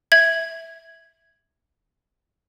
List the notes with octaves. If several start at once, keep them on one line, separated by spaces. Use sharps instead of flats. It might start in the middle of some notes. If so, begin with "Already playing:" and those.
E5 G#6 F#7